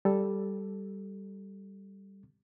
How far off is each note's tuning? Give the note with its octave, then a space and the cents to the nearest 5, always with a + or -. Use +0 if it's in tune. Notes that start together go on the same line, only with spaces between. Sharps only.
G3 +0 A4 +0